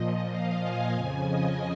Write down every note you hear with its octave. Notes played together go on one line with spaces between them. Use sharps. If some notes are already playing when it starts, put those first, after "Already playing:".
Already playing: A#2 F3 D#5
F5
G#5
F2 C#3 F3 G#5
D#5